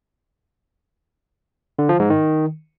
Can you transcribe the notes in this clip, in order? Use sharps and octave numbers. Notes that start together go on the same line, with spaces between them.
D3
F3
G#2
D#3